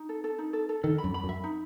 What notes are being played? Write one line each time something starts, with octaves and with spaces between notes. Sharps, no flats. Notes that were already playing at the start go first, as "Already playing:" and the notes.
Already playing: D#4
A4
A4
D#4
A4
A4
D#3 A4
B5
F#2
B5
F#2
E5
D#4